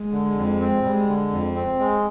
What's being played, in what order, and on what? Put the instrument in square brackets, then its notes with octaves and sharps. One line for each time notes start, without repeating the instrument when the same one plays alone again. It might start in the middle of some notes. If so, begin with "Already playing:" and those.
Already playing: [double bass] G#3
[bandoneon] D3
F2
C4
[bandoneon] G3 [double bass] G#3
[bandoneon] D3
F2
C4
G#3